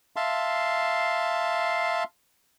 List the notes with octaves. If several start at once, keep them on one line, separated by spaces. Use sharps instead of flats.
E5 F5 A5 C6